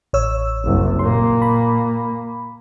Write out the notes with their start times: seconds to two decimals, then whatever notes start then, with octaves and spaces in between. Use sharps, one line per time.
0.13 A1 C#5 E6
0.64 F#1 C2
0.99 A#2 A#3 C6
1.42 B5